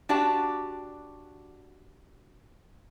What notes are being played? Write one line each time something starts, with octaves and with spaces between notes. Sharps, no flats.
D4 F#4 G4 D5 A5